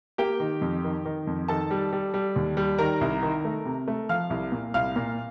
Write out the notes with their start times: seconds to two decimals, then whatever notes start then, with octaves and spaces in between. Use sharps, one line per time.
0.18 A#3 G4 G5
0.40 D#3
0.61 F2
0.84 D#3
1.05 D#3
1.27 F2
1.48 D#3 A4 A5
1.70 G3
1.93 G3
2.14 G3
2.36 D#2
2.57 G3
2.78 D#3 A#4 A#5
3.01 C2
3.23 D#3
3.45 A3
3.65 C3
3.88 A3
4.09 F3 F5 F6
4.30 C2
4.52 A#2
4.74 C2 F5 F6
4.96 A#2